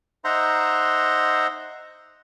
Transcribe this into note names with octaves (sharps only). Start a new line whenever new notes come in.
D#4 C5 E5 F#5 A#5 C6